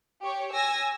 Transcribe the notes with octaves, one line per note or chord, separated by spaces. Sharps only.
G4 C#5
G#5 E6 A#6